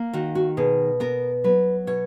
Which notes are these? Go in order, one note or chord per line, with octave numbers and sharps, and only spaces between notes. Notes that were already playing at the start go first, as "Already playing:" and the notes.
Already playing: A#3
D#3 F#4
F#4
B2 G#4
B3 A#4
F#3 B4
B2 C#5